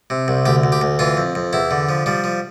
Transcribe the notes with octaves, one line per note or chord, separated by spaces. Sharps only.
C3
C2
D2 G4
D2
G4
D2
E3 F4
F2
F2
E2 E4
D3
F3
F3 G3
F3